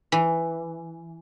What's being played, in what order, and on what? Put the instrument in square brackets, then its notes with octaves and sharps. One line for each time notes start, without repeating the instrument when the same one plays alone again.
[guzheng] E3